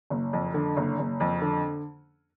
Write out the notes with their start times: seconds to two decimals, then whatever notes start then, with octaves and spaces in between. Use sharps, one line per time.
0.10 F#1
0.33 F2
0.54 D3
0.77 F#1
0.99 F#1
1.20 F2
1.41 D3